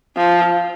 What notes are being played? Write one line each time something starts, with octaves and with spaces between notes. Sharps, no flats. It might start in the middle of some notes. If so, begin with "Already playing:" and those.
F3